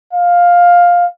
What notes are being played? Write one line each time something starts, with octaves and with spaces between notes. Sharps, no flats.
F5